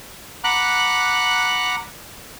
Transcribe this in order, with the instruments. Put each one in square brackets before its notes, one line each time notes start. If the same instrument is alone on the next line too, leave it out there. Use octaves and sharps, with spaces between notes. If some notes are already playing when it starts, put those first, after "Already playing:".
[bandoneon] F#5 A#5 B5 D6 F#6